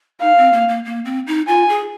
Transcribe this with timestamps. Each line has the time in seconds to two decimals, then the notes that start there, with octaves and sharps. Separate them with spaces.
0.21 D#4 F5
0.38 C4
0.53 A#3
0.68 A#3
0.85 A#3
1.05 C4
1.27 D#4
1.47 F4 G#5
1.69 G#4